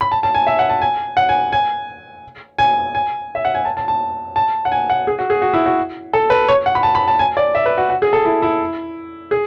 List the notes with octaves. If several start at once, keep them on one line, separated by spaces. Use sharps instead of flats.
B5
A5
A5
G#5
E5
F#5
A5
G#5
F#5
G#5
G#5
G#5
G#5
E5
F#5
G#5
A5
A5
A5
A5
F#5
G#5
F#5
G#4
F#4
G#4
F#4
E4
F#4
A4
B4
C#5
F#5
B5
A5
B5
A5
G#5
D5
E5
B4
F#4
F#4
G#4
A4
E4
E4
G#4